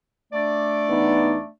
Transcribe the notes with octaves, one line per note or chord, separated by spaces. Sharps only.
A3 D4 D5
E2 B3 D#4